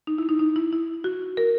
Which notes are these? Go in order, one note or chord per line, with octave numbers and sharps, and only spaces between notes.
D#4
E4
D#4
D#4
E4
E4
F#4
A#4